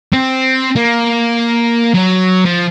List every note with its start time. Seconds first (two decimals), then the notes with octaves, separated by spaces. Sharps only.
0.13 C4
0.76 A#3
1.94 F#3
2.46 F3